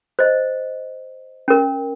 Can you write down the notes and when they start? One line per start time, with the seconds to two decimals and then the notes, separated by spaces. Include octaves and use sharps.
0.19 C5 D#5
1.48 C#4 A#4